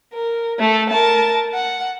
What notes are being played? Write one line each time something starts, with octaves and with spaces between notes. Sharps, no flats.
A#4
A3 A4
A#4 A5
F#5